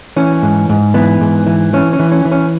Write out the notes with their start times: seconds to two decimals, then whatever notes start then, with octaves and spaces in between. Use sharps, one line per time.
0.16 E3 C#4
0.42 G#2
0.69 G#2
0.94 E3 B3
1.21 G#2
1.46 E3
1.73 E3 C#4
1.93 C#4
1.99 E3
2.12 C#4
2.25 E3
2.32 C#4